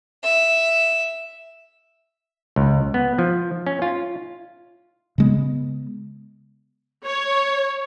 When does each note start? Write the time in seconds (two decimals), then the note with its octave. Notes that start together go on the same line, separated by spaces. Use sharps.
0.23 E5
2.56 C#2
2.94 B3
3.19 F3
3.67 C#4
3.82 F4
5.18 C#3 G#3 B3
7.05 C#5